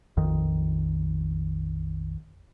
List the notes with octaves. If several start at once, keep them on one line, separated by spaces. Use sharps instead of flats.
A#1 F2 D#3